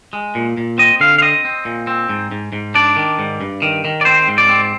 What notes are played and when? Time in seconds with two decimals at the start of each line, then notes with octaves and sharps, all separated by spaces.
0.13 G#3
0.35 A#2
0.57 A#2
0.78 C4 D#5
1.00 D3 F5
1.18 F5
1.22 C4 D#5
1.45 C4
1.65 A#2
1.87 C4
2.09 G#2
2.31 G#2
2.53 G#2
2.75 D4 D5
2.96 D#3
3.19 G#2
3.41 G2
3.62 D#3
3.85 D#3
4.01 D5
4.05 C4 C5
4.28 G#2
4.38 D5
4.49 C4